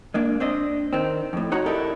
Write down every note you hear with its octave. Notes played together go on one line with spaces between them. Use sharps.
G#3 A#3 D4
C4 D4 D#5
D#3 C4
F2 A2
D#4 F#4 C#5 F#5 A#5
D#4 E4 G4 A4 A#4 D5